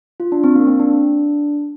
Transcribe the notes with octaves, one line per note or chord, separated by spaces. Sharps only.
F4
D4
C4
A#3
C4
D4